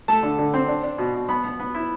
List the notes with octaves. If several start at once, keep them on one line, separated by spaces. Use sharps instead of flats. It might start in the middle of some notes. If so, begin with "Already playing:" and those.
A3 A5
D3
D3
C4
D4
D4
B2
B2
B3 B5
B3
B3
E4